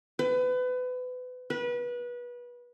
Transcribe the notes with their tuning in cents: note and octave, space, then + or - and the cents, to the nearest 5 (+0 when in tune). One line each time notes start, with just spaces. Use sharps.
B4 +30
B4 -25